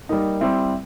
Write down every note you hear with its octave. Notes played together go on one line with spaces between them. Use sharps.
G3 A#3 D#4
G3 C4 E4